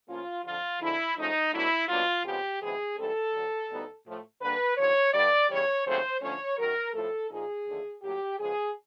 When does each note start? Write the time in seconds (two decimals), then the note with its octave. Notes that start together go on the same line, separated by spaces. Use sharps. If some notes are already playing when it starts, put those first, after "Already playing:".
0.08 A2 F3 A#3 C#4 F4
0.44 F2 D3 F3 F4
0.80 D2 D3 F3 G#3 E4
1.16 G#2 F3 A3 C#4 D#4
1.52 B2 F#3 A3 D4 E4
1.89 B2 F#3 A#3 D4 F4
2.24 F2 C#3 F3 G#3 B3 G4
2.61 D2 C3 E3 G#3 B3 G#4
2.97 G#2 E3 G3 C4 A4
3.33 D2 D3 F#3
3.70 D2 D3 G3 B3 D#4
4.06 A2 F3 A3
4.41 D3 G3 A#3 D4 B4
4.77 D#2 D3 F3 C#5
5.13 G2 D3 G3 D5
5.50 E2 C#3 E3 G3 C#5
5.85 D#2 C#3 F#3 A3 C4 C5
6.21 D3 F3 A3 C#4 C#5
6.57 F#2 D#3 F#3 A#4
6.94 A2 F3 A3 A4
7.30 A#2 F3 A#3 D#4 G#4
7.67 D#2 D3 F3 A3
8.02 A2 F#3 A#3 G4
8.38 C#3 F3 G#3 B3 G#4